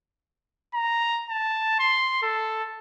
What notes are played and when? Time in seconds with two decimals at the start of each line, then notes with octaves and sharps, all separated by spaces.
0.74 A#5
1.30 A5
1.79 C6
2.22 A4